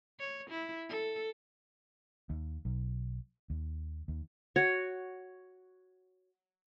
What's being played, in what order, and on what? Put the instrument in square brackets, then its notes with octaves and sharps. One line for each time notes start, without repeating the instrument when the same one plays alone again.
[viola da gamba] C#5
E4
A4
[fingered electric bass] D#2
B1
D#2
D#2
[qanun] F#4 C#5